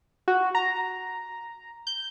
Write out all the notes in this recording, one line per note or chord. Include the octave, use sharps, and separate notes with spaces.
F#4
A#5
G6